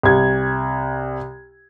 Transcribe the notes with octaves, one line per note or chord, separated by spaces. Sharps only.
C2 G#6